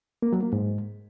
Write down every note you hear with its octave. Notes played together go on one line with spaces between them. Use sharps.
A#3
F#3
A#3
G#2